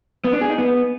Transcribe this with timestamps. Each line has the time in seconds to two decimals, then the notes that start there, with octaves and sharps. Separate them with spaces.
0.24 B3
0.33 D4
0.41 G#4
0.50 D#4
0.58 B3